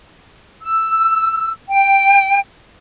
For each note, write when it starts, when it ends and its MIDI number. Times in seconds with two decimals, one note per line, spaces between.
0.62 1.51 88
1.70 2.38 79